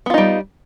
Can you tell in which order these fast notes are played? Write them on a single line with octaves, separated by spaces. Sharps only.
B3 F4 D#4 G3